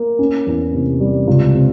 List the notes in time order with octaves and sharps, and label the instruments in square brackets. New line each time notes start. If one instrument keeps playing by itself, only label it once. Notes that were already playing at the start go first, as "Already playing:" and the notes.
Already playing: [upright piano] A#3
C#4
E2
C3
G3
C#2
C3